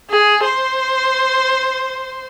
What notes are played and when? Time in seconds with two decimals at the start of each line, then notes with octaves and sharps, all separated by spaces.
0.10 G#4
0.45 C5